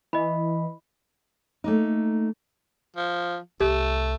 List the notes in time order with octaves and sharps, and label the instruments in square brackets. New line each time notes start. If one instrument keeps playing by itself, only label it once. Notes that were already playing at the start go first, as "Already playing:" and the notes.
[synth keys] E3 [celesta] D#5 B5
[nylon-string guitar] A3 A#3 D#4
[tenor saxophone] F3
[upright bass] C2 [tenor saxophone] A3 [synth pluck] G4